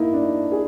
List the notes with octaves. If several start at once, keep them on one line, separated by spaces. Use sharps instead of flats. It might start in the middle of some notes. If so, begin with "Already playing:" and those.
Already playing: A#3 D#4 E4
D4
D#4
G#4